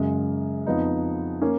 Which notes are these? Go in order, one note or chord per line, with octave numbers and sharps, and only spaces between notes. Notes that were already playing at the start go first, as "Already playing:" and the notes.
Already playing: F#2 C#3 G#3
F2 F3 B3 D#4
A#3 C#4